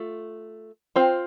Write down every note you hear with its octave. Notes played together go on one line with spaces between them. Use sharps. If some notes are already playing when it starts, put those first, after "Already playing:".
Already playing: A3 F4
C4 F4 C5